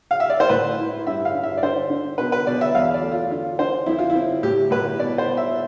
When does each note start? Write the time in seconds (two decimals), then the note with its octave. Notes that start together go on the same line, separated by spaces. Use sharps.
0.11 F5
0.20 E5
0.30 D5
0.40 C5
0.49 A2 B4
0.78 E4
1.07 G2 E5
1.25 F5
1.34 G2
1.43 E5
1.57 D5
1.63 D3 C5
1.90 D3
2.18 B2 B4
2.32 B4
2.47 B2 D5
2.61 E5
2.75 E2 F5
2.94 D5
3.03 A3
3.11 F4
3.31 D3 F4
3.59 D3 C5
3.86 F2 E4
3.99 F4
4.10 E4
4.15 C4
4.43 A2 G4
4.71 A2 B4
4.99 B2 D5
5.18 C5
5.27 B2
5.37 E5